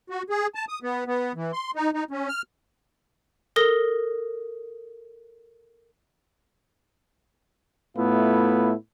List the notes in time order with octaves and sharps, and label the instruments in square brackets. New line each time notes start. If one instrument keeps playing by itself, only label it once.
[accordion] F#4
G#4
A5
D#6
B3
B3
E3
C6
D#4
D#4
C#4
F6
[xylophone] A4 A#4 D#6 A#6 G7
[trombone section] A2 A3 B3 E4 F4